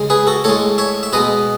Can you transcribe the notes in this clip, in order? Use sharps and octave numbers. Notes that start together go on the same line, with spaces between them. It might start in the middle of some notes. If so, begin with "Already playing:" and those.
Already playing: C#3 G#3
G#4 B4
F#4 A4
A2 G#3 A4 C#5
C#5 E5
E5
B2 G#3 B4 D#5